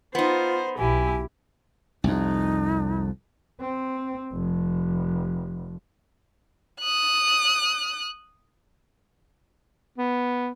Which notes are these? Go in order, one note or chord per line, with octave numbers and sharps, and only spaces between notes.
B3 D#4 F4 C5
B1 E4 G4 G#5
C2 F2 D#4
C4
F1
D#6 F#6
B3